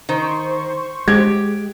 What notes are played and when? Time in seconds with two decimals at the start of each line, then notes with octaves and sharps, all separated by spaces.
0.09 D#3 C5 C#6
1.08 G#3 G4 G#6